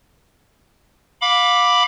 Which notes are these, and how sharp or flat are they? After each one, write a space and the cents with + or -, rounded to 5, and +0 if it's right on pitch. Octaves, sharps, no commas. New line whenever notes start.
F5 +35 B5 +0 D6 +0